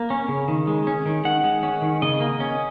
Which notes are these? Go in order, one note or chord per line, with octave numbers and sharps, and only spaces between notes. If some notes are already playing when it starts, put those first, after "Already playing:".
Already playing: A#3
C#4
C#3
D#3
G#3
C#4
D#3
D#3 F#5
G#3
C#4
D#3
C#3 D#5
A#3
C#4